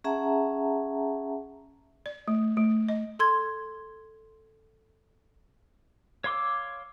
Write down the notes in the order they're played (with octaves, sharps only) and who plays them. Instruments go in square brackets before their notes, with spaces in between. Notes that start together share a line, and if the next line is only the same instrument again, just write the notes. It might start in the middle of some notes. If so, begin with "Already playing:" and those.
[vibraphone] C#4 G#4 E5 F#5 A5 A#5
[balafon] D5
A3
A3
D#5
[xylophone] A4 C6 G#6
[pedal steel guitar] C#5 F5 C6 D6 E6